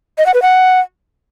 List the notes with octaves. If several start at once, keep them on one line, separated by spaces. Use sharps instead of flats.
D#5
F#5
B4
F#5